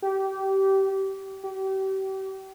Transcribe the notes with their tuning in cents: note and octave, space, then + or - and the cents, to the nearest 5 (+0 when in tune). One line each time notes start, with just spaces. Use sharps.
G4 -25
G4 -35